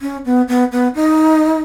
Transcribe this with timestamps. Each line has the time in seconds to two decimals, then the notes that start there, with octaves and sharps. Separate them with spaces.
0.01 C#4
0.25 B3
0.48 B3
0.72 B3
0.95 D#4